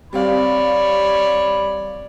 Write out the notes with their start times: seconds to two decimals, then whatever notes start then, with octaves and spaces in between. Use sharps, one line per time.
0.13 G3 C4 C#5 D5 F5 B5